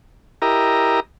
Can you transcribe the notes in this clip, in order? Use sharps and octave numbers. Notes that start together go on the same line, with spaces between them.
E4 G4 A#4 D#5 A#5